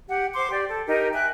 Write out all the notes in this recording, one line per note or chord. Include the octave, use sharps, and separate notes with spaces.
G4 F#5
C5 C6 D6
G4 D5
A4
D#4 G4 A#4
E5 G5 G#5 F#6